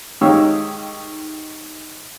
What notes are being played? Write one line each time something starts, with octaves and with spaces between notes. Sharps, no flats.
G#2 D#3 G4 C#5 F5 E6